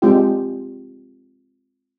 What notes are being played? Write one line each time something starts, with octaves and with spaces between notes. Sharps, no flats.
G#3 C4 D4 F4 G4 G5